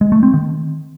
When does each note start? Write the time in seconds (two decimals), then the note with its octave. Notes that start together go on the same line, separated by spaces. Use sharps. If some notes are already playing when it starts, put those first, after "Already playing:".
0.01 G#3
0.12 A3
0.23 C4
0.34 D#3